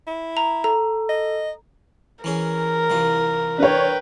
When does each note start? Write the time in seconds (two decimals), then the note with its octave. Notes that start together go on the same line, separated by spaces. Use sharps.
0.07 E4
0.37 A#5
0.64 A4 A#5
1.09 D#5
2.24 E3 C#4 G#4 A#4
2.90 C2 E3 F4
3.58 D4 B4 C#5 G5